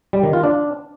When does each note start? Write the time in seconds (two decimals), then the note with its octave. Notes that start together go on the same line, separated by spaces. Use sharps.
0.13 G3
0.23 D#3
0.33 F4
0.43 D4